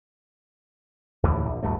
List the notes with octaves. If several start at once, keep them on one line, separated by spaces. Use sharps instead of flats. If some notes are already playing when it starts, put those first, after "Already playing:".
D#2 A2 D3 E3
A#1
D1 D2 G2 A3